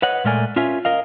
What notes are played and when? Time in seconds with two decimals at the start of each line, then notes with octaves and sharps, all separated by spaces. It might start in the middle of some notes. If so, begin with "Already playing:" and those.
0.02 B4 C#5 D#5 F#5
0.24 A#2 G#3 A3 A#4 D5 G#5
0.56 C#4 F4 A#4 C#5 E5 G#5
0.85 A#4 D#5 F5